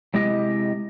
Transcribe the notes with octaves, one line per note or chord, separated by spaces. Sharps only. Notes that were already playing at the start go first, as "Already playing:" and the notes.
C3 G#3 E4 G4 D#5